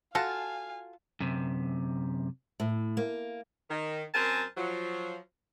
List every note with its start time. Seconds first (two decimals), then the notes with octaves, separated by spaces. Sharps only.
0.15 F4 F#4 A4 F5 G#5 A5
1.20 F#2 C3
2.60 A2
2.97 A#3
3.70 D#3
4.14 F#2 C4 A#4 C5 G#5 A5
4.57 F3 F#3